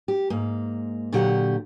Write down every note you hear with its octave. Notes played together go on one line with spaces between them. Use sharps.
G4
G#2 A#3
A#2 D3 F#3 G4 D5 F#5